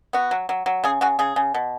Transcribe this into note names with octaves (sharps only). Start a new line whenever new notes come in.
B3 F#4
F#3
F#3
F#3
C#3 G#4
C#3 F#4
C#3 G#4
C#3
B2